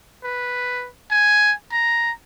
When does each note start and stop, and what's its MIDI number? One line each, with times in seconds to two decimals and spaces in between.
0.24 0.88 71
1.11 1.53 80
1.72 2.12 82